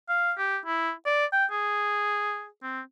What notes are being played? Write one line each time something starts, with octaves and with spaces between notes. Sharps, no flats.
F5
G4
E4
D5
G5
G#4
C4